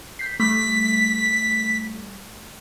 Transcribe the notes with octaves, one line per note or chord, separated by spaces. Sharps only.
G6 B6 C7
G3 A3 B6